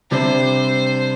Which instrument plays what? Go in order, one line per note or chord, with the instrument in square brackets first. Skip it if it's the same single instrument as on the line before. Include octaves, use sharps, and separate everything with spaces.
[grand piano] C3 G3 D4 [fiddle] C5